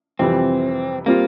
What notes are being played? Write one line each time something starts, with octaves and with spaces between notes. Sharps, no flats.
F2 C3 E3 G3 C4
G3 A#3 C4 F4